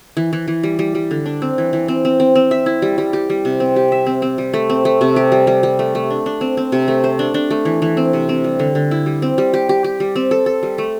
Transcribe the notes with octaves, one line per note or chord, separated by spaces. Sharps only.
E3
E3
E3
G3
G3
G3
D3
D4
C4
E3
E3
C4
C4
C4
C4
E5
E4
G3
G3
G4
G3
C3
C4
G4
E5
C4
C4
G3
A3
C4
A3
C3
G4
G3
G3
G3
A3
A3
D4
D4
C4
C4
C3
A3
C5
D4
D4
A3
E3
E3
C4
C3
C4
G3
D3
D3
E4
G3
C4
G3
G4
G4
G4
G3
C4
A4
A4
G3
A3